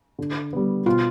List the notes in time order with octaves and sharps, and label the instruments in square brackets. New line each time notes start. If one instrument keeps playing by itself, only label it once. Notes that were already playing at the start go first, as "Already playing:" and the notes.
[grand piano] D3
G3 B3
[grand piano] B2 [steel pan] F4